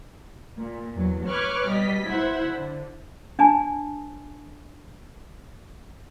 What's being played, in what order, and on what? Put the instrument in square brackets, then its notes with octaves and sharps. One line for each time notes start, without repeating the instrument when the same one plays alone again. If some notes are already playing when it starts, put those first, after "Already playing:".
[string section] A#2
E2 F#3
B4 C#5 C#6 D6 F6 F#6
B2 G3 D#5 B6
E4 C5 E5 F#5
D3
[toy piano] D4 G#5 A5